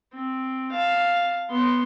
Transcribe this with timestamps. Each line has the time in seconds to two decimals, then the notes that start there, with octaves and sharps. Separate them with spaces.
0.13 C4
0.71 F5 A5
1.50 B3 C6